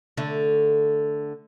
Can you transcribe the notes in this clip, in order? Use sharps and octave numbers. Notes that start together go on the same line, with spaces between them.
D3 A3